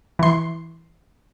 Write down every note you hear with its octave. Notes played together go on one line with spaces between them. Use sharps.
E3 C6